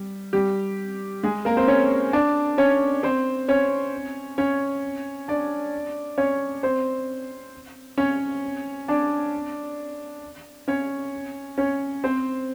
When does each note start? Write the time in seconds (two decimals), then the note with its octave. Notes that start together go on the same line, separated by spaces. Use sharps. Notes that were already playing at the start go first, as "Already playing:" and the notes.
Already playing: G3
0.33 G3 G4
1.23 G#3 G#4
1.45 A#3 A#4
1.57 C4 C5
1.68 C#4 C#5
2.13 D4 D5
2.58 C#4 C#5
3.03 C4 C5
3.48 C#4 C#5
4.38 C#4 C#5
5.28 D4 D5
6.18 C#4 C#5
6.63 C4 C5
7.98 C#4 C#5
8.88 D4 D5
10.68 C#4 C#5
11.58 C#4 C#5
12.04 C4 C5